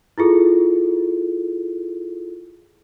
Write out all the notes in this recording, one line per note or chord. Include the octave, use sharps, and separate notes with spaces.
E4 F4 G#4 A4